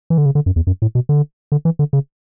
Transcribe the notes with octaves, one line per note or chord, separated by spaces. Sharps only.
E3
D3
C#3
D3
F#2
E2
F#2
A2
B2
D3
D3
E3
D3
C#3